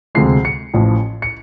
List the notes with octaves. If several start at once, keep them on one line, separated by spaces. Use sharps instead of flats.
D2 C3 F3 G#3 C7
C#7
A1 A2 F3
C#7